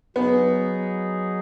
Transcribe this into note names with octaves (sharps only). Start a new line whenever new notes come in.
F#3 B3 D#4 G#4